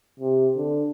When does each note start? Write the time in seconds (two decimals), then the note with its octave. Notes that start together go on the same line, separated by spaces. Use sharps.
0.20 C3
0.56 D3